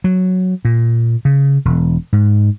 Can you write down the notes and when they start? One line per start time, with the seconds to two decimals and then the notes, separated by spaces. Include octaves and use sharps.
0.04 F#3
0.65 A#2
1.25 C#3
1.65 E1
2.13 G#2